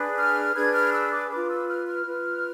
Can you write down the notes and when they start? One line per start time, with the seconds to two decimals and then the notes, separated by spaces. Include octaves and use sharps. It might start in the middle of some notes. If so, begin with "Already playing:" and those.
Already playing: D4 G#4 B4
0.18 F6
0.55 D4 G#4 B4 G#6
0.74 F6
0.93 E6
1.12 D6
1.30 F4 B4 D6
1.50 E6
1.68 F6
1.87 F6
2.06 F4 B4